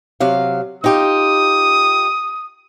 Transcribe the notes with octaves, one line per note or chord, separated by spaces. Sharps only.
C3 F#3 F5
D#4 F4 G4 D#6